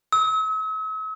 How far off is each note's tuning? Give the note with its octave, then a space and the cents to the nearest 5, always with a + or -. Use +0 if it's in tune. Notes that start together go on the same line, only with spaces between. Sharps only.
E6 -45